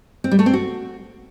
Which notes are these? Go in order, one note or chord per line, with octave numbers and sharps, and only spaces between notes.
C4
G3
A3
C4
F#4